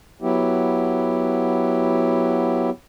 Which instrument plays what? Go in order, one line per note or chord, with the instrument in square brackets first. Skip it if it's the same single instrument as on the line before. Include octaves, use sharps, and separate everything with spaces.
[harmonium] F#3 B3 E4 G4